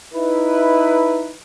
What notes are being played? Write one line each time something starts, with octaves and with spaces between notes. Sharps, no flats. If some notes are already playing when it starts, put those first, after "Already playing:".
D#4 E4 B4